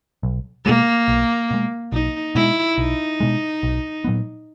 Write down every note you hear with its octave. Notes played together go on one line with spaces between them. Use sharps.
B1
B2 G#3 A#3
B1
B2 G#3
B1 D#4
B2 G#3 E4
B1 D#4
B2 G#3
B1
A#2 F#3 B3